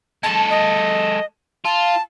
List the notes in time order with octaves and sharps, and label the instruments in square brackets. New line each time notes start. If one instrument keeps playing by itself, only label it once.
[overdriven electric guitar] G#3 A4 [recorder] A5
[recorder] D#5
[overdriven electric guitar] F4 [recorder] A5